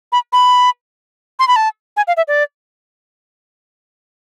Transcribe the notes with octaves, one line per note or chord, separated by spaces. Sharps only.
B5
B5
C6
B5
A5
G#5
F5
E5
D5